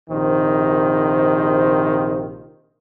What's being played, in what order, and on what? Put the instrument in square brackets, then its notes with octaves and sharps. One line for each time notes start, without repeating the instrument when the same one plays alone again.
[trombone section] A#1 C3 D#3 C5